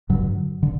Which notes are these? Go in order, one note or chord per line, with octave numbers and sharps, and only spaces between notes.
G2 D3 F#3
D3